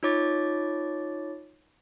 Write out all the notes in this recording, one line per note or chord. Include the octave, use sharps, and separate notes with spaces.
D#4 F4 C#5 D6 A6